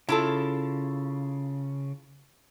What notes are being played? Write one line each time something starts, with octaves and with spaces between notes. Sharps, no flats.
C#3 E4 F4 A4